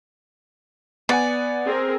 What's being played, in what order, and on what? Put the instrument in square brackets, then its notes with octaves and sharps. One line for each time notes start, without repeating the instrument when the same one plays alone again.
[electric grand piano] B3 F#5 G#5 [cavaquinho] D5
[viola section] C4 G#4 A#4